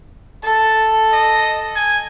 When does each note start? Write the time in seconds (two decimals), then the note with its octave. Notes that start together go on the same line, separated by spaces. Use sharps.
0.43 A4 A5
1.12 D#5
1.76 G#5